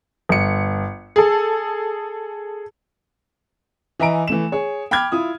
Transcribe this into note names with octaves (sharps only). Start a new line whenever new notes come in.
G1 C#7
G#4 A4
E3 D#5 E5 G#5 A#5 D7
E3 A3 E7
G#4 C#5
G5 B5 D6 F6 G#6
E4 F4 D#6